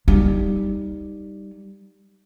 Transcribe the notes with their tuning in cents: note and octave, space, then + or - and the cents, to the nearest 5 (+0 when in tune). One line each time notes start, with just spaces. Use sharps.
G3 +0 D#4 +0